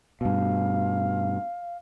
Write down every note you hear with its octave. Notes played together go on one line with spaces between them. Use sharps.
G2 B2 F5